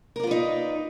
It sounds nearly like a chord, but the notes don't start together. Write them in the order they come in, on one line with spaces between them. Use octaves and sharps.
A#4 D5 F4 B4 D#4